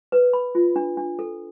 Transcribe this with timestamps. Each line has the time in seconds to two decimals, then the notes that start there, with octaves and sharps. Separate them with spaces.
0.12 B4
0.33 B5
0.55 F4
0.76 D4
0.97 D4
1.19 A4